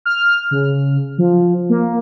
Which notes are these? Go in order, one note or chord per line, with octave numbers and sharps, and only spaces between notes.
F6
C#3
F3
A#3